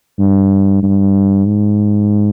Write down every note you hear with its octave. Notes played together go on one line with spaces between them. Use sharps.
G2
G2
G#2